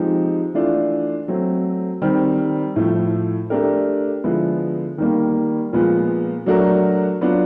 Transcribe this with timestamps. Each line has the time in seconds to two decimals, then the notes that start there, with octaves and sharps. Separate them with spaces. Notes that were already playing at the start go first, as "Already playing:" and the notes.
Already playing: F3 G#3 C4 D#4 G4
0.54 E3 A3 D4 F4
1.28 F#3 A3 C4
2.02 D#3 G3 C4
2.76 A2 F3 A3
3.50 A3 D4 G4 A#4
4.24 D3 F3 G#3 B3 E4
4.98 D#3 G3 A#3
5.73 A#2 F3 G#3 B3
6.46 F#3 A3 D4 F#4 A#4
7.21 F#3 B3 D4 F4